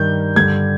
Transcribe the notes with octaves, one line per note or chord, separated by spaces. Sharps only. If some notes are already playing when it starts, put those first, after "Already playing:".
Already playing: G2 D#3 G3 G6
G2 D3 G3 G#6